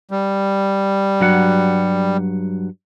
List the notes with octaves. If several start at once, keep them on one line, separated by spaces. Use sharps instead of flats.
G3
G2 F#3 F#5